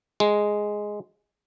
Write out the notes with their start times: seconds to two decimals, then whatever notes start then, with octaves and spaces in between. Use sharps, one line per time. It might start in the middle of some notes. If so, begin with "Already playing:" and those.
0.20 G#3